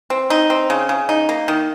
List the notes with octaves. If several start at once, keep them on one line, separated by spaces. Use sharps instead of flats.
C4
D#4
C4
C#3
C#3
D#4
A#3
D#3